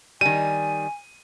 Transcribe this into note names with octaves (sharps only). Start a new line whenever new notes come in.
D#3 G3 G#5 D#7